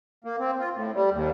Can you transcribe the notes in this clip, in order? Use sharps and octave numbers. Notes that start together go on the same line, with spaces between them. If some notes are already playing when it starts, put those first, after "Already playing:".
A#3
C4
F4
A2
G3
D#2